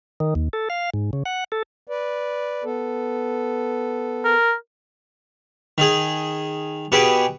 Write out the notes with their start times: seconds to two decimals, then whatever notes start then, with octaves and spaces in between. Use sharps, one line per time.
0.20 D#3
0.35 D#2
0.53 A4
0.70 F5
0.94 G#2
1.13 C#3
1.26 F#5
1.52 A4
1.87 B4 D5
2.64 B3 A4
4.25 A#4
5.78 D#3 G#4
6.92 B2 G4 G#4 B4